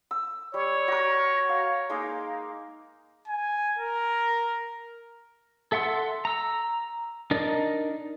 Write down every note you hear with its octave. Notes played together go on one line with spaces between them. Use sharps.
E6
G3 C#5
F#4 A#4
F5
G#3 A#3 D#4
G#5
A#4
A4 E5 F#5 C6 E6
A#5 E6
D4 D#4 A#4 D5 D#5